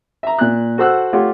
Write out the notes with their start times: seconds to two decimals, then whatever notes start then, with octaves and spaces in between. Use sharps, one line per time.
0.23 E5 A#5
0.39 A#2 F#6
0.78 F#4 A4 C5 F#5 E6 F#6
1.13 A3 F4 G4 C#5 F#5